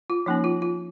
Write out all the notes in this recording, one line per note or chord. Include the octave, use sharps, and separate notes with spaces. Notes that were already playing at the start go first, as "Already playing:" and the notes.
F4
F3 A#3 C#4 D#4
F4
F4